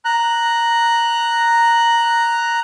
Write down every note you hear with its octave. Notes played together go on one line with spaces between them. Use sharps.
A#5 F#6